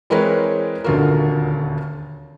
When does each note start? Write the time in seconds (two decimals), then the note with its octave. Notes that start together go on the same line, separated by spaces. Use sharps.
0.10 E3 G#3 C4 A#4 B4 C#5
0.84 D#1 D2 D3 F4 F#4 A#4